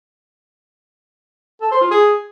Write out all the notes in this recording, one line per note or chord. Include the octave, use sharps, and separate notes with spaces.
A4
C5
F4
G#4